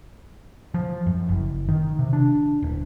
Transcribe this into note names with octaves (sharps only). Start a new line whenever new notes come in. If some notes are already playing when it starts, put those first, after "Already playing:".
F3
F#2
F#1
D#3
C3
D4
D1